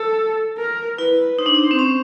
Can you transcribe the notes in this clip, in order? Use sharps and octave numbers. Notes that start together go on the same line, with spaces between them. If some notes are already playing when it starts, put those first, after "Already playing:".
Already playing: A4
A#4
E4 B4
D#4 C5
D4
D#4
C4
C#4